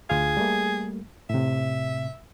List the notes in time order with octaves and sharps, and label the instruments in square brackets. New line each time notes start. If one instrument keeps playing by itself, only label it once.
[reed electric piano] D2 F4 F5 [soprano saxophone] G#4
[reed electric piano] G3 A3 A#3
[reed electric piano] A2 C3 [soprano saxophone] E5